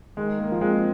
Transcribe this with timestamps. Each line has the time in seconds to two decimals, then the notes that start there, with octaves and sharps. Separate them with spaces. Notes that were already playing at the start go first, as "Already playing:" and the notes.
0.17 D#3 G#3
0.40 A#3
0.52 F3
0.61 G#3 C4